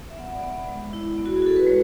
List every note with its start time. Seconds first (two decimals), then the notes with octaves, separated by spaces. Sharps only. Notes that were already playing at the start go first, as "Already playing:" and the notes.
0.10 E5
0.18 B3 F#5
0.35 D5
0.43 B3
0.51 D5
0.68 G#3
0.93 E4
1.18 B3
1.26 F#4
1.36 G#4
1.42 F#4 A4
1.56 B4
1.67 G#3 C#5